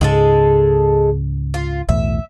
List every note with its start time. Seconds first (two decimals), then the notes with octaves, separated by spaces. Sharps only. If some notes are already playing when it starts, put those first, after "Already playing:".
0.01 C#2 G#2 C#3 G#3 G#4 A4
1.54 F4
1.89 B1 E2 A2 E5